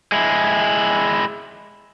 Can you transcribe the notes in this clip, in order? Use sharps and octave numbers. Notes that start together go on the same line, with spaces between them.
G#3 E4